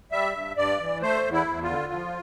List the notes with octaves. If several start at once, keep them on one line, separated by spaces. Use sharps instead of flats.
G3 E5
G2
G2 D5
E3
A3 C5
E2
E4
E2
F4
D3
F3